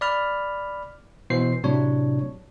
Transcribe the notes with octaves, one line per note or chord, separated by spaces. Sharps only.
D5 B5 F6
B2 E3 C5 C7
A2 C3 F#3 D4 C#5